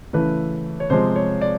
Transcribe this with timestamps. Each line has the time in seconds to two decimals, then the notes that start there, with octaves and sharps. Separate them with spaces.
0.13 C#3 E3 A3 B4
0.80 C#5
0.90 C3 F3 G#3 C5
1.16 C#5
1.41 D5